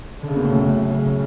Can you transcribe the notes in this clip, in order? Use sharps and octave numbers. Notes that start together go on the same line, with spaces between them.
D3
C#3
B2
A2
F#2 C#3
C#3